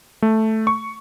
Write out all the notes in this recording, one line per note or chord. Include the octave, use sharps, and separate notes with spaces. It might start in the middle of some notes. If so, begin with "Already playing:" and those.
A3
C#6